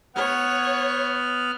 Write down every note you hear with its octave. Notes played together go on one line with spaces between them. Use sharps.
B3 C#5 F#5 F6